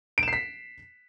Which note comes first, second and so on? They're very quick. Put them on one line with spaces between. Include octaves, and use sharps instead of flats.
D7 E7 C7 B6